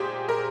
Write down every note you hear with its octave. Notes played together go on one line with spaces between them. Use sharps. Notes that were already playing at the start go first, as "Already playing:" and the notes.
Already playing: A#2 G#3 G4 G#4 C5
A#4